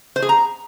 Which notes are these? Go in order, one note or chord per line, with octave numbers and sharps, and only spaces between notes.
C5
G#4
A#5